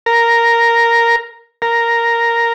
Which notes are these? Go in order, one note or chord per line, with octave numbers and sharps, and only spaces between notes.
A#4
A#4